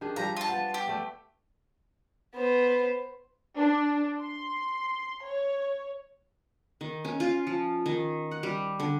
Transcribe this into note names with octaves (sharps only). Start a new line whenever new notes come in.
D#3 D4 G#4
F3 G3 A#5
F4 A5
B3
G4
A3 D5
B3 C5
D4
C6
C#5
D#3
C#4
F4
F3
D#3
F#5
G3
D3